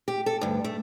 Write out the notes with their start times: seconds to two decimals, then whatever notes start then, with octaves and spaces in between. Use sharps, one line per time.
0.08 G4
0.26 A4
0.41 D2 G2
0.64 A3